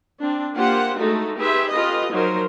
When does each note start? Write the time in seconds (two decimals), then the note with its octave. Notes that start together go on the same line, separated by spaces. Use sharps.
0.19 C4 D4
0.54 A#3 F4 G4 C5 F#5
0.97 G#3 A3 D#4 F#4 A4
1.38 D#4 G4 G#4 B4 C5 E5
1.71 C#4 F4 G4 A4 B4 D#5
2.10 F3 F#3 D#4 A#4 C5